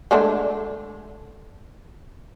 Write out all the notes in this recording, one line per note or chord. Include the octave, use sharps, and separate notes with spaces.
G#3 A3 D4